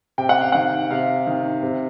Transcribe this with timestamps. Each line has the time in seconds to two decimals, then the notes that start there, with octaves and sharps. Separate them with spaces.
0.18 C3 G5
0.29 F#5
0.41 F5
0.52 D#3 F#5
0.90 C3 F5
1.27 D#3
1.63 C3